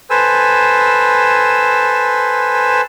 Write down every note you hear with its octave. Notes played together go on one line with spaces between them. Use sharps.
A4 B4 C5 G#5 E6